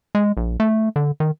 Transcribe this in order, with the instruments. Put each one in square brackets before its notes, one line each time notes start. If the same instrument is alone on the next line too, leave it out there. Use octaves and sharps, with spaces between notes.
[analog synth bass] G#3
A#1
A3
D3
D#3